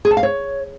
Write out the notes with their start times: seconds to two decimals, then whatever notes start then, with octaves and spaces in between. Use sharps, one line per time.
0.05 G#4
0.11 A5
0.17 F5
0.23 C#5